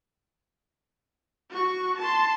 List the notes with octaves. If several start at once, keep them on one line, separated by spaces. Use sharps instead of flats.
F#4 C#6
A5 C6